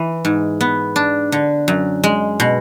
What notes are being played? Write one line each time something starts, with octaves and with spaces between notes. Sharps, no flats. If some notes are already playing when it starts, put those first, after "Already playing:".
Already playing: E3
G#2
B3
D4
D3
F#2
G#3
B2